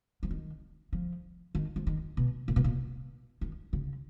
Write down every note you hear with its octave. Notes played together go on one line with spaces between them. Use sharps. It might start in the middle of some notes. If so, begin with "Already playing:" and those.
F3
D#3
F3
D#3
F3
D#3
B2
A#2
B2
A#2
D#3
C#3